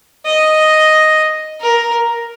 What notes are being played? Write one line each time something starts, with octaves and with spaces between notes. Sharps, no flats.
D#5
A#4